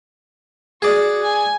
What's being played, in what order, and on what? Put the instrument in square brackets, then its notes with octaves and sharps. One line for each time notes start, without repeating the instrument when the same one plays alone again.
[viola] F#4 [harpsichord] G#4 D5
[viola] G#5